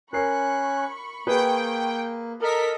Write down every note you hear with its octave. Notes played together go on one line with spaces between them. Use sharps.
C#4 A#4 B5 C#6 F#6 C7
A#3 G#4 B4 G5
A4 A#4 D#5 B6